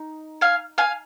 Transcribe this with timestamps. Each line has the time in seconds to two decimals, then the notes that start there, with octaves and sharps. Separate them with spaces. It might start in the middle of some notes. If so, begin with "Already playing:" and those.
Already playing: D#4
0.41 F5 G#5
0.78 F5 G#5